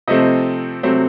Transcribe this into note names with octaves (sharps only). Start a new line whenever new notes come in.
C3 F3 A3 C4 D#5
C3 F#3 A3 C4